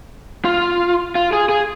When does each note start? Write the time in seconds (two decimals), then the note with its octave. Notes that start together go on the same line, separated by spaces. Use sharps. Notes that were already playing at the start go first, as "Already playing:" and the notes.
0.45 F4
1.15 F4
1.33 G#4
1.49 G#4